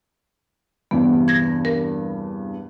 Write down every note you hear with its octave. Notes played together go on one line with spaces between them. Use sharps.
E2 G2 C3 B3
G#6 A#6
A#4